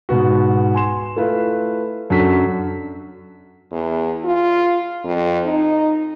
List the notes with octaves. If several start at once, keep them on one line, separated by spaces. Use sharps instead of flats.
G#2 B2 B3 F#4
G#5 C6 E7
A3 E4 F4 B4
F#2 D4 F#4 A4 B6
E2
F4
F2
D#4